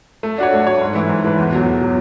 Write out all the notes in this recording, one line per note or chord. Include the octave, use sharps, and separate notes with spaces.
A3
D4 F#4 C#5
A3
D4 F#4 C#5
G#2
E3 A3 E4 B4
G#2
E3 A3 E4 B4
E2
B2 F#3
E2
B2 F#3